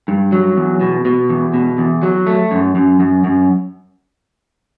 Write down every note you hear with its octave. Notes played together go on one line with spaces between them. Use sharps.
G2
F#3
E2
B2
B2
E2
B2
E2
F#3
A3
F#2
F#2
F#2
F#2